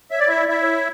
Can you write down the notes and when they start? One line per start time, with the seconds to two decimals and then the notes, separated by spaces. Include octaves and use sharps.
0.11 C#5 E5
0.20 D5
0.28 E4 E5
0.36 D5
0.48 E4 E5
0.61 C#5